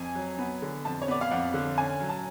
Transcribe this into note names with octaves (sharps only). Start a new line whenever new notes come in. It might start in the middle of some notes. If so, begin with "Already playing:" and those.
Already playing: F2 G#5
F#3
B3
D3
F2 A5
C#5
B3 D5
F5
F2 F#5
D3
C#4 G#5
F#3
A5